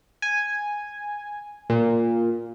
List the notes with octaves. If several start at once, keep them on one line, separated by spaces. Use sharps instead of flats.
G#5
A#2